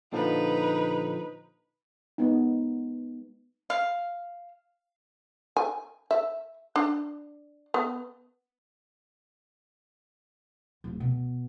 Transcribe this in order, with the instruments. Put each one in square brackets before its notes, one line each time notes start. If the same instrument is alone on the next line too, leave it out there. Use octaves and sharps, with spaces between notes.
[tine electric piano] A#2 D3 F3 [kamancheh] D#4 B4
[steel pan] G#3 B3 D#4
[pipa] F5
[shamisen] G#5
E5
D4
B3
[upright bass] D1 A#1
B2